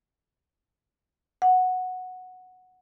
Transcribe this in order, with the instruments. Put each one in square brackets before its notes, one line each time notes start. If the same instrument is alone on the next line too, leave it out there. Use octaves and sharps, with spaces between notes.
[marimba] F#5